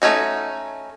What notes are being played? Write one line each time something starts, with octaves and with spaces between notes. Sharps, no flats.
A3 C#4 D#4 F#4